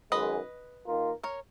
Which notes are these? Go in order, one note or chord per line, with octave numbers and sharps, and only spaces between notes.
F#2 D#3 G#3 B4 D#5
D#3 A#3 F4 A#4
A#4 C#5